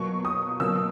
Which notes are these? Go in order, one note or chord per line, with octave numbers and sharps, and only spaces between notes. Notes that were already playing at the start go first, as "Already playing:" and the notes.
Already playing: B2 F#3 A#3 C#6
D#6
B2 F#3 A#3 E6